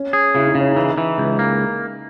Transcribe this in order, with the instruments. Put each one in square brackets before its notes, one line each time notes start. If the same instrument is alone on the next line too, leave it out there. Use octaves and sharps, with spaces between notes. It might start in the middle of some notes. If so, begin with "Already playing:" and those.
Already playing: [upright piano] C#4
[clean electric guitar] G#4
[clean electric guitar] C#3 [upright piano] E4
[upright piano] D#4
[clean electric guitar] C#3 [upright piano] C#4
[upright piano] D#4
[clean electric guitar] E3
E3
C#2
A#3